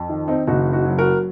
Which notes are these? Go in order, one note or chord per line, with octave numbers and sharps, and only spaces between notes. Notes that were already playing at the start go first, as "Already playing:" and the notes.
Already playing: F2
D#3
C4 D#4
F#1 D#4 F#4
D#4 F#4
F#3
F#4 A#4